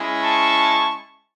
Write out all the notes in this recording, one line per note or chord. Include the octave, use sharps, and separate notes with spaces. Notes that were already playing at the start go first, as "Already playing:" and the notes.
Already playing: G#3 C#4 E4
A5 C#6